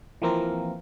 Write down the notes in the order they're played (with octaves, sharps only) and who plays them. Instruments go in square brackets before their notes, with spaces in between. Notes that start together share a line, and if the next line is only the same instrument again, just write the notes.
[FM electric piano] E3 F3 A#3 C4 A#4